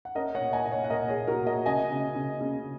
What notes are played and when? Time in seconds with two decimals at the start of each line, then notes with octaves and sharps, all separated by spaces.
0.05 F#5
0.15 C#4 A#4 D#5
0.35 C#5 F#5
0.40 A#2
0.53 D#5 G#5
0.66 A#2 D#5
0.71 C#5 F#5
0.84 F#5
0.90 A#2 A#4 D#5
1.09 G#4 C#5
1.16 A#2
1.27 F#4 A#4
1.41 A#2
1.47 A#4 D#5
1.66 C#3 D#5 G#5
1.91 C#3
2.15 C#3
2.41 C#3